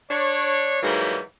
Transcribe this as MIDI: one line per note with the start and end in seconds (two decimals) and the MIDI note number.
0.10 0.77 62
0.10 0.77 73
0.83 1.20 44
0.83 1.20 52
0.83 1.20 54
0.83 1.20 55
0.83 1.20 58